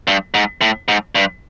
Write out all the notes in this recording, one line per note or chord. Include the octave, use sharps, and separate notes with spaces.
G2
G#2
A2
G#2
G2